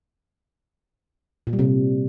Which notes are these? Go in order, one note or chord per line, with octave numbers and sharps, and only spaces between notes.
A#2
G3
C3